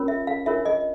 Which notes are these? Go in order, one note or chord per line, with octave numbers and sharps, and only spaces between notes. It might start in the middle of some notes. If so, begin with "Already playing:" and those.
Already playing: C#4 F4 A#4 C#5
E5
F5
D4 F4 A#4 C#5 E5
D#5